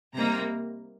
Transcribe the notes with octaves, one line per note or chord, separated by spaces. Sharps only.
C3 G3 A#3 D#4 A#5